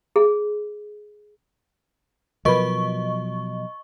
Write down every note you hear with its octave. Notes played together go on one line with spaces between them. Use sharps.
G#4
B2 F3 F#3 A#4 B4 D#5 B5 C#6